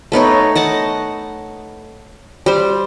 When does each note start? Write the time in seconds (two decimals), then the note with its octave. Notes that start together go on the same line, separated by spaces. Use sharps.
0.12 A3 B3 D#4 C#5
0.56 D#5 F#5 A5
2.46 G3 C5